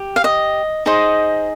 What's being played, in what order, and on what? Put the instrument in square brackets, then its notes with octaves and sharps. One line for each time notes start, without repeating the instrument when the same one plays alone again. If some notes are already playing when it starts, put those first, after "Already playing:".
Already playing: [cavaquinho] G4
F5
D#5
D#4 G#4 C5 D#5